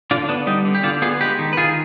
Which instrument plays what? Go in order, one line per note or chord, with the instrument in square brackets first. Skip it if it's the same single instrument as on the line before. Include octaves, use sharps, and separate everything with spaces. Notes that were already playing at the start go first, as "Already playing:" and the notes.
[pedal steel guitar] D3 D4 F4
B3 D4
G3 D#4
D3
G4
D3 D4 F4
B3 F4 G#4
G#3 G4 B4
D#3
B4
D#3 F4 G#4